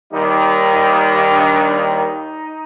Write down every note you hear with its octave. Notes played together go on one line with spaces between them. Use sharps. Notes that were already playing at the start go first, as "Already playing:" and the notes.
D#2 D#3 G3 D#4
D#4
D4
D#4